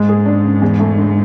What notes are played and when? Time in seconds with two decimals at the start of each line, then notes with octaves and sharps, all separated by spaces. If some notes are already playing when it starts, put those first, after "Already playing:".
Already playing: G#2 G#3
0.09 G#4
0.26 D4
0.44 C#3
0.62 E2
0.79 A3
0.97 D3